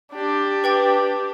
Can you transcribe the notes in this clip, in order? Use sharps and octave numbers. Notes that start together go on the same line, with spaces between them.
D4 G4
B4 G5 A6